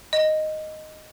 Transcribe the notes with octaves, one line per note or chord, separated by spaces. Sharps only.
D#5